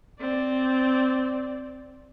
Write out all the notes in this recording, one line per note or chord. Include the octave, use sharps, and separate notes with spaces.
C4 D5